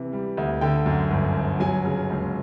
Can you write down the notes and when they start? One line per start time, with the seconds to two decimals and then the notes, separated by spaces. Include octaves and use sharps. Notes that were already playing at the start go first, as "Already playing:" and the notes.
Already playing: C3 E3
0.13 G3
0.37 D2
0.61 D3 G5
0.86 F#2
1.11 G1
1.35 G1
1.60 F#3 G#5
1.85 C#3
2.10 C#2